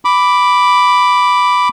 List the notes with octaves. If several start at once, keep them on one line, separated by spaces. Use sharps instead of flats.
B5 D6